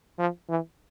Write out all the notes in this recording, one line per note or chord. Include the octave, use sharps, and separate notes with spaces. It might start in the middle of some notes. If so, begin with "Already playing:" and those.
F3
E3